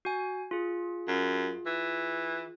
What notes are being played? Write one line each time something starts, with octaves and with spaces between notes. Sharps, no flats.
F#4 G#5
F4 G#4
F#2
E3